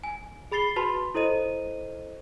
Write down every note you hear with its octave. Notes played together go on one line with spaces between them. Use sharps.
G#5
G#4 B5 A6 C7 G7
F#4 B4 A5 B5 C6
E4 A4 C5 D#5 D#7